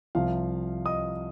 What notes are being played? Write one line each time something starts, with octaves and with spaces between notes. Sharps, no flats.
C2 C3 F3 F5
D#5 D#6